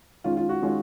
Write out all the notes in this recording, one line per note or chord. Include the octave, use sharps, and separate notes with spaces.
D#3 G#3 C#4 F4
F4
F#4
D#3 G#3 C#4 F4